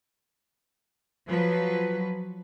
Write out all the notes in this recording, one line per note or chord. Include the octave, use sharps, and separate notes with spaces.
F3 F#3 B4